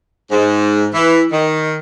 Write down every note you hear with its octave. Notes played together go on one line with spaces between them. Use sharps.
G#2
E3
D#3